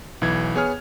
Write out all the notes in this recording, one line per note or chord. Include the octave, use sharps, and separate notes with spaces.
B1 E3 G#6
B3 G#4 C#5 G#5 F6